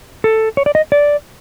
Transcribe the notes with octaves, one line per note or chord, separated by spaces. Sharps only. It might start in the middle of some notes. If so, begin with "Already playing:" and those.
A4
C#5
D5
D#5
D5